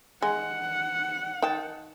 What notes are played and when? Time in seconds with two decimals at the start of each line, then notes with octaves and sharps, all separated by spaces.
0.22 G#3 F#5
1.42 D#3 G5 A5